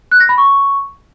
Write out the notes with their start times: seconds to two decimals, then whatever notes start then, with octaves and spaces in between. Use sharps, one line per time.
0.12 F#6
0.20 A#6
0.29 B5
0.38 C#6